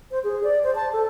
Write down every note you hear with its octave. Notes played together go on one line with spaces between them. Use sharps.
C5
G#4
D5
C5
A5
A4